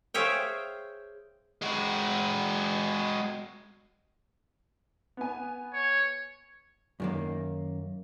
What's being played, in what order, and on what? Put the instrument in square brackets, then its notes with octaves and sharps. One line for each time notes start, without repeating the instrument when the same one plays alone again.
[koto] G#4 C5 C#5 E5 F5 G5
[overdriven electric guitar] G#3 F#4
[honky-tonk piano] B3 G#5
[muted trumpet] C#5
[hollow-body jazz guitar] F#2 D#3 A#3